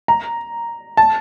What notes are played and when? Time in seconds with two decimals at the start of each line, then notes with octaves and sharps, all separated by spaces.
0.08 A#5
0.97 A5